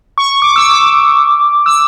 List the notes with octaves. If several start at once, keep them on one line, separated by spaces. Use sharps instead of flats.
C#6
D6
E6
D6
E6